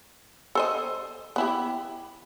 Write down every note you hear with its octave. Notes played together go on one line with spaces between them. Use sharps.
A4 C5 D#5
B3 E4 G4